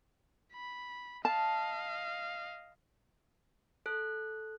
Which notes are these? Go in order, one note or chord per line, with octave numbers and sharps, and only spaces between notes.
B5
D#5 F5 A5
A4 F#6